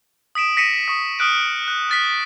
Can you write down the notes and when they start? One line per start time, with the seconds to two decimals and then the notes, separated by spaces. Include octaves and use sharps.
0.35 D#6 B6 D7 E7
0.57 A#6 B6 C#7 D#7 E7
0.88 C#6 D#6
1.19 D#6 F6 F#6 D7 D#7
1.68 F#6
1.89 F6 A6 B6